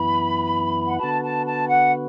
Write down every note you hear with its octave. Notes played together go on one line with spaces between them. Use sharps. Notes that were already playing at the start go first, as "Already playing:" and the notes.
Already playing: F#2 E3 B3 E4 B5
F#5
D3 B3 F#4 B4 A5
A5
A5
F#5